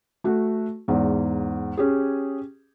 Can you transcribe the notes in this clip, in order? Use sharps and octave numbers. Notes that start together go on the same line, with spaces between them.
A3 F#4
E2 G#2
C#4 G4 G#4